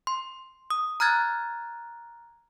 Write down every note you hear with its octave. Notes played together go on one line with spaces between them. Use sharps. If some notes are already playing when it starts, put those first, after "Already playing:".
C6
D#6
A#5 F6 F#6 G#6 A6